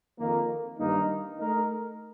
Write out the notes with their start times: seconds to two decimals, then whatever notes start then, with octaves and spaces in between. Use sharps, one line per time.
0.19 F2 D#3 A#3
0.79 G2 D#3 A#3 D#4
1.39 A3 D#4 A#4